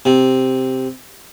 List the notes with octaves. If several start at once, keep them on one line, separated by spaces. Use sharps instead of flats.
C3